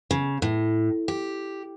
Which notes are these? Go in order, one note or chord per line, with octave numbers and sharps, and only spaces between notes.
C#3
A2
G4